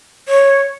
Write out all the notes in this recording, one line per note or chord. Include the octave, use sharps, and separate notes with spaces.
C#5